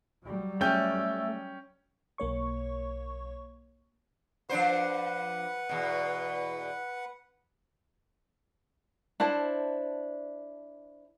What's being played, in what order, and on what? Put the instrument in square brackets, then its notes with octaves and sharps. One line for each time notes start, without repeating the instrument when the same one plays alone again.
[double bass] F#3 G3
[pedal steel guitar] A3 [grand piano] C#4 G5 G6
[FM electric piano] B1 A#3 C#5 C#6
[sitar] F3 D4 C5 [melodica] B4 F#5
[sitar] E2 B2
[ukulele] D4 E4 C5 A5